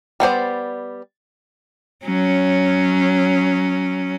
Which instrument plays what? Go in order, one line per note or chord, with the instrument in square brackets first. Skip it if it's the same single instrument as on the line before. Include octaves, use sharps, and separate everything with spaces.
[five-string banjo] G3 B3 C5 D5
[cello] F#3 C#4